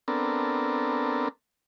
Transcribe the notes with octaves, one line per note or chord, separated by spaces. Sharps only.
B3 C4 D4 A4 A#4